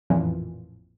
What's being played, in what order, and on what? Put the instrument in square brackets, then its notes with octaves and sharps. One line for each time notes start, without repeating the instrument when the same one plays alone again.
[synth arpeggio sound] A1 F2 A#2 E3